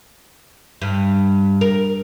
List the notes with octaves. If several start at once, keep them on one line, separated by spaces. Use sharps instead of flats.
G2
A#4